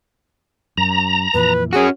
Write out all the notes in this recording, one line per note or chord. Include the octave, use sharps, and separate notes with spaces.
F#2 A#5
F2 A#2 E3 B4
C#4 F#4 G#4